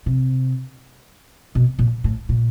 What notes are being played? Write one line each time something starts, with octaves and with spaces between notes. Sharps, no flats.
C3
B2
A#2
A2
A#2